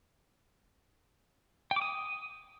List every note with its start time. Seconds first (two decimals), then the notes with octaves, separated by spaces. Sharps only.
1.71 G5
1.76 D6
1.82 D#6